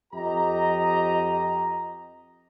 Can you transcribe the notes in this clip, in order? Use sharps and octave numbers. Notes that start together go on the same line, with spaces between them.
F2 G4 D#5 A#5